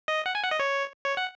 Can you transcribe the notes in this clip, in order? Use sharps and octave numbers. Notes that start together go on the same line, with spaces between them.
D#5
F#5
G#5
F#5
D#5
C#5
C#5
F#5